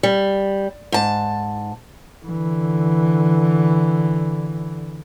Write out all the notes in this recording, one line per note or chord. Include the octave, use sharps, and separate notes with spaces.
G3
G#2 A5
D3 E3